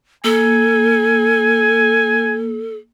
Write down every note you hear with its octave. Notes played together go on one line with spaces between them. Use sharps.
A#3 A4 G#5